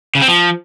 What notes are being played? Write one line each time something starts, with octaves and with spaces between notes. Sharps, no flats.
C#3
C4
F3